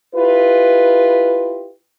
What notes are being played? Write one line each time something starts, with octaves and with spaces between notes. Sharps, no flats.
E4 F4 G4 B4